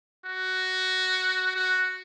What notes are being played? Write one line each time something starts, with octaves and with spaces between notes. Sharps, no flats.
F#4
F#4